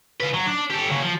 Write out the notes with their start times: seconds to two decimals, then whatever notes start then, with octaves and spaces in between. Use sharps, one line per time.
0.20 F4 B4
0.34 F#3
0.46 D4
0.70 G4 A4
0.89 F#2 C#3
1.03 F3